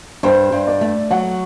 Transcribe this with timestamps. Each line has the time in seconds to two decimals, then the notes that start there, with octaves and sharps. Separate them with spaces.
0.23 G2 C5
0.52 G2
0.67 D5
0.81 A3
1.11 F#3 F#5